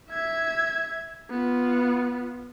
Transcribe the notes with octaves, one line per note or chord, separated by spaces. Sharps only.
E5 G#6
B3 F4